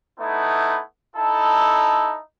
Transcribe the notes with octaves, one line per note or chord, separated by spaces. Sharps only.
A3 B3 D#4 E4
D#4 E4 A4